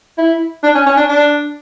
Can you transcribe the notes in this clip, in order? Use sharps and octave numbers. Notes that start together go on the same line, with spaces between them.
E4
D4
C#4
C#4
D4
D4